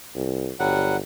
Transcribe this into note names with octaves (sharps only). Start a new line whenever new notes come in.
C2
G1 F#3 G3 F#5